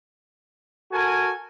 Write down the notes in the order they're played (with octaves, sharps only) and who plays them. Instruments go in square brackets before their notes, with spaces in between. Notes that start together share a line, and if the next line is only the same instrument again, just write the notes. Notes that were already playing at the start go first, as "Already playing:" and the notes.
[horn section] F#4 A4 A#4 G#5